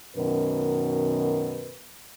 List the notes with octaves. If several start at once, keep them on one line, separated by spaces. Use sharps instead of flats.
F#2 B2 D#3 A#4 B4